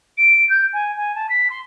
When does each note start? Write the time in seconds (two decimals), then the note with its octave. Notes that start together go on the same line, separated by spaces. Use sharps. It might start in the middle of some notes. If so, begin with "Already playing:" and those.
0.17 D7
0.49 G6
0.73 G#5
0.96 G#5
1.15 A5
1.29 B6
1.50 C6